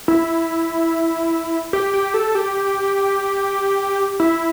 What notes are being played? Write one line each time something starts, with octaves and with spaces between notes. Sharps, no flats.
E4
G4
G4
A4
G4
E4